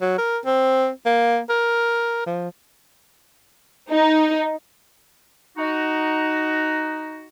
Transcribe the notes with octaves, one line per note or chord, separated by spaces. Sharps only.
F#3
A#4
C4
A#3
A#4
F3
D#4
D#4 F#4